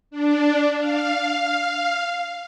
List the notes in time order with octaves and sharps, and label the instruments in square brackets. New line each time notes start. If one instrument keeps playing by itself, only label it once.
[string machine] D4
F5